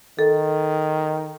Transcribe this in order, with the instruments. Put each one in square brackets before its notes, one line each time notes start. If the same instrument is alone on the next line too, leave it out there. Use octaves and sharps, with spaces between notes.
[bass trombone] D#3 [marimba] A4